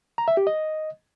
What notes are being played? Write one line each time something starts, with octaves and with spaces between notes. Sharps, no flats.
A#5
E5
G4
D#5